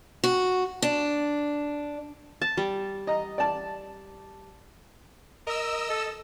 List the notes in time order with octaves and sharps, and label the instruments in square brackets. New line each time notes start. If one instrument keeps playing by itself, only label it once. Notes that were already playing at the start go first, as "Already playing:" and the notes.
[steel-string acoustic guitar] F#4
D4
[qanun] A5
G3
[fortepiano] D#5 A#5
D5 A5
[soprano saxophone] A#4 [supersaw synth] D#5 E6
[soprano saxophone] A4